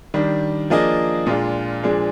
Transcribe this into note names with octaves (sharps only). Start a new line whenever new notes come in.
D#3 G3 D4
F3 A#3 D4 G#4 D#5
A#2 G#3 D4 F4
A#2 F3 G#3 D4 G#4